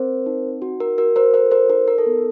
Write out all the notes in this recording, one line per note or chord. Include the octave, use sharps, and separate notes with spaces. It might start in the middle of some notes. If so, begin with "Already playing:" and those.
Already playing: C4 A#4 C5
D#4
F#4
A#4
F#4 A#4
A#4 C5
A4 A#4 C5
A#4 C5
D#4 A#4
A#4
A4
B3